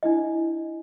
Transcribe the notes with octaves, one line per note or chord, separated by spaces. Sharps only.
D4 E4 D#5